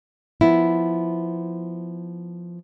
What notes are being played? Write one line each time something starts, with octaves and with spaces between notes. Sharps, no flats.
F3 B3 E4